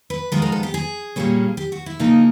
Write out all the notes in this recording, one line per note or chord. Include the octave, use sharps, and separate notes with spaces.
B4
F3 G#3 B3 D#4 A#4
A#4
A4
G4
G#4
A#2 G3 A#3 C#4
G4
F#4
E4
C#3 F3 A#3 D#4